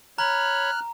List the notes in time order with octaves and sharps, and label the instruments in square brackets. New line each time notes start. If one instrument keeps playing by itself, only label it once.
[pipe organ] C#5 B5 [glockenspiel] A#5 [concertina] F6 F#6